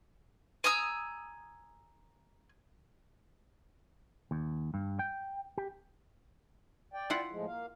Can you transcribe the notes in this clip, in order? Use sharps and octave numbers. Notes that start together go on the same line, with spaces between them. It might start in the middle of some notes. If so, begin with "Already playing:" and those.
G#5 A#5 D#6 E6
D#2
G2
G5
G4
D5 G5
E4 F4 F#5
A2 F3 G#3
A#3 F5